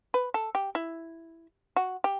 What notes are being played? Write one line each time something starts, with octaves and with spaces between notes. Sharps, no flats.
B4
A4
G4
E4
F#4
G4